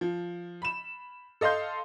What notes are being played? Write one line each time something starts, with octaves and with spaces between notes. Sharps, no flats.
F3
B5 E7
A4 D#5 F5 C6 G6